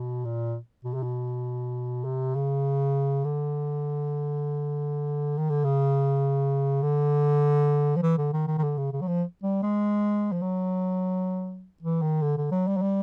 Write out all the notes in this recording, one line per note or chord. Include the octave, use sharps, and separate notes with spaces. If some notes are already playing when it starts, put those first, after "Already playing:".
Already playing: B2
A#2
B2
C3
B2
C3
C#3
D3
D#3
D3
C#3
D3
F3
E3
D3
D#3
D#3
D#3
D3
C#3
C#3
F#3
F3
G3
G#3
F3
F#3
E3
D#3
D3
D3
F#3
G3
F#3
G3